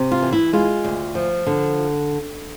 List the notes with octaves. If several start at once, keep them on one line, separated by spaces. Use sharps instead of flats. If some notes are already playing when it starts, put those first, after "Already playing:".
Already playing: C3
F4
E3
E4
G#3 F4
D2
F3
D3